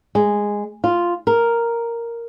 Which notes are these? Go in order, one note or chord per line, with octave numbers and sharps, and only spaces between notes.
G#3
F4
A#4